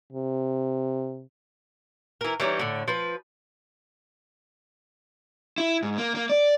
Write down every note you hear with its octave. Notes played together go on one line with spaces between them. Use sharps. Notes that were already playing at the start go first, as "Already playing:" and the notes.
C3
E3 A#4
E3 G3 C#4 D#4
A2 D3
F3 B4
E4
G#2
A#3
A#3
D5